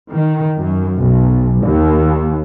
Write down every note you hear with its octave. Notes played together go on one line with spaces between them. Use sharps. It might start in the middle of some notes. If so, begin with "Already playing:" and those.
D#3
F#2
B1
D#2